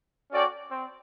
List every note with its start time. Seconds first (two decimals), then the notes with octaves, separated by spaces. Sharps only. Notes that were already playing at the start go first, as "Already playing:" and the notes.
0.31 C#4 F#4 A4 D5 G5
0.72 C4